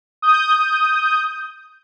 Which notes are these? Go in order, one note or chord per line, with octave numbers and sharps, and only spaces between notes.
D#6 G6